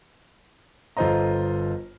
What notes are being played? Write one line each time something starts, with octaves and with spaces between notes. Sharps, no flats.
G1 F4 A4 C5 D#5 A#5